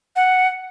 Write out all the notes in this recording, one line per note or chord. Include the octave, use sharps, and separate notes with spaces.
F#5